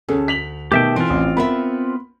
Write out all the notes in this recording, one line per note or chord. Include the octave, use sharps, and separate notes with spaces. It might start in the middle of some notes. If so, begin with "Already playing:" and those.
D2 C#4 G#4 A4
B6 F7 F#7
B2 D#3 A3 G4 E5 G5
E3 C4 F4
A1
B3 A#4 E5 B5